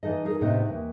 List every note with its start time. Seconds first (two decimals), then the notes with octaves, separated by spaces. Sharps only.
0.03 E3 D#4 A4 D#5
0.25 D#4 G#4 A#4
0.41 A2 C3 B3 D#4 C5 D#5
0.69 D#2 E3